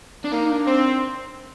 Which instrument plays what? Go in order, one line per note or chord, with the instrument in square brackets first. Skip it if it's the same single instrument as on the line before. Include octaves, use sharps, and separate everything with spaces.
[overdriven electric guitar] D4
[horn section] A#3 [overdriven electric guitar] D#4
[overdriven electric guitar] D4
[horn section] C4